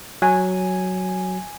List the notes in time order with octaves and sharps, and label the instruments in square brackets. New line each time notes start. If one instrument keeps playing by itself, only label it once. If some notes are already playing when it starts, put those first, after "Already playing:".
[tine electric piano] F#3 [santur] G#5